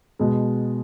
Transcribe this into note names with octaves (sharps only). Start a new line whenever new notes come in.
B2 G#3